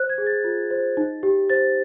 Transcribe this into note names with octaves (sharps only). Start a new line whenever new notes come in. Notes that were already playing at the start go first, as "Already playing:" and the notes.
Already playing: C5 F#6
G#6
G#4
A6
F4
C5
D#4
G4
C5 A6